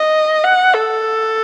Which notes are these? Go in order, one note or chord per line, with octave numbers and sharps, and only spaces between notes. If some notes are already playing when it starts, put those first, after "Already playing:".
Already playing: D#5
F#5
A4